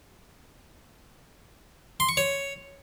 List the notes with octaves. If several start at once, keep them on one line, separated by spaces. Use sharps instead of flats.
C6
C#6
C#5